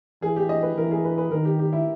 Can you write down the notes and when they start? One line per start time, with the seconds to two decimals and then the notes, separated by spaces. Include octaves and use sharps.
0.22 E3 G#4
0.36 G4
0.49 D#5
0.63 B4
0.77 E3 A#4
0.91 G#4
1.04 B4
1.18 B4
1.31 D#3 A#4
1.45 G4
1.59 G4
1.73 E4